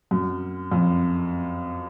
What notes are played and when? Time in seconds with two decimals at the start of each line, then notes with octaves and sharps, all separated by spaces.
0.11 F#2
0.72 F2